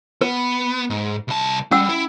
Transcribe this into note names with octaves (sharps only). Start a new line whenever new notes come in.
B3 B4
G#2
C2 A5
G3 C#4 F#5 E6
E4